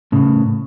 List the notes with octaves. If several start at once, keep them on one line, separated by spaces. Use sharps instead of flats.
A2 C#3